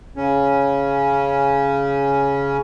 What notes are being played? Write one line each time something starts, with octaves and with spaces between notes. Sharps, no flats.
C#3 C#4